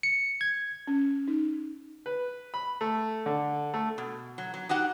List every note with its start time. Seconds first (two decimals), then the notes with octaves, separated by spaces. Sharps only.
0.03 C#7
0.41 G#6
0.87 C#4
1.28 D#4
2.06 B4
2.54 B5
2.81 A3
3.26 D3
3.74 A3
3.98 B2
4.38 F#3
4.54 F#3
4.69 D#4 F#4 G4 F#5